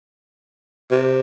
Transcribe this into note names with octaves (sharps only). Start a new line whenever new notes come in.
C3